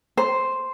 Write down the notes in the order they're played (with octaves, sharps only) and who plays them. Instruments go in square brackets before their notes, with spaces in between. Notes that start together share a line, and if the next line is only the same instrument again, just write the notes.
[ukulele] C5